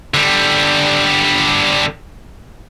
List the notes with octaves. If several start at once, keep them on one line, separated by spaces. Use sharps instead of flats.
D3 G3